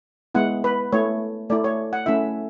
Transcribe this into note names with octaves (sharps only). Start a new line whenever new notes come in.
G#3 B3 E4 F#5
B4
A3 E4 C#5
A3 E4 D5
C#5
F#5
A3 C#4 E4 E5